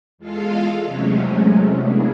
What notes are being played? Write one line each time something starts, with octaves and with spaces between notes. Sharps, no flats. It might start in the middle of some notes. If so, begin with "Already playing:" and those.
E2 G#3 F4 A4 F5
E2 C3 F#3 G#3 A3 C#4
A#3 B3 D4 E4 G#4